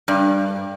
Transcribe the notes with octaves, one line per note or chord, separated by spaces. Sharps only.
G2